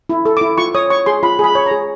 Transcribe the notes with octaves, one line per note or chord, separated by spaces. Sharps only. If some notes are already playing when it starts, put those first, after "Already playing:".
E4
A4
D6
E4
F4 C#6
C#5 D#6
C#5 C#6
G#4 C6
F4 B5
G#4 B5
C#5
A#5
G#4